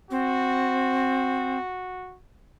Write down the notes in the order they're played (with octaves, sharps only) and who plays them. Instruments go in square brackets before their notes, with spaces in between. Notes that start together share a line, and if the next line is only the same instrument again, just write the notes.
[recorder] C4 [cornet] F#4